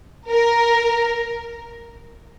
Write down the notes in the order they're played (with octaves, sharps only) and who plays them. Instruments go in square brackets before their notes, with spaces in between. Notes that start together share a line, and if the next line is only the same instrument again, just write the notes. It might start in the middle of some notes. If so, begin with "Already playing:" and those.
[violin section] A#4